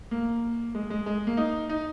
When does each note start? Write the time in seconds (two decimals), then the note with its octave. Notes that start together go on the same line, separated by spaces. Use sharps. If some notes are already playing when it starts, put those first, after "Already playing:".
0.11 A#3
0.75 G#3
0.90 G#3
1.06 G#3
1.27 A#3
1.37 D#4
1.69 D#4